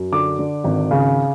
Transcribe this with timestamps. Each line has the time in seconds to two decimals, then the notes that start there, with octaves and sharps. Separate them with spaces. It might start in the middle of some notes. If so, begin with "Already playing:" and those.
Already playing: F#2
0.12 D3 D6
0.39 D3
0.64 G#1
0.91 C#3